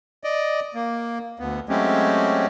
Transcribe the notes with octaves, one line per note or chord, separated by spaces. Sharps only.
D5 D#5
A#3
D2 B3
F#3 G#3 A3 C4 C#4 G4